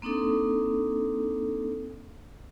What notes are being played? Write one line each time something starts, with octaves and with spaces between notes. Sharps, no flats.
A#3 C4 D4 D#4 A4